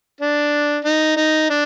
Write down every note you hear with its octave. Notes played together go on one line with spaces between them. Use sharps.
D4
D#4
D#4
D4